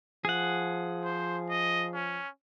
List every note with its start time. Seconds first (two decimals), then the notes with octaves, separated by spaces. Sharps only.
0.25 F3 G#4 F#5
1.04 C5
1.50 D#5
1.94 C#4